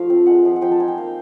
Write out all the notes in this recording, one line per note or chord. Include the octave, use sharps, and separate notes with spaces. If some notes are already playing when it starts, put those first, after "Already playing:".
Already playing: F3 A3 F4 F5
C4
G#3 F#5
F3
F#5
F3 G5
A5
D#4 G#5
G5
A#3 F5